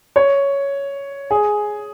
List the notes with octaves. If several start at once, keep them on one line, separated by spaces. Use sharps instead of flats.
C#5
G#4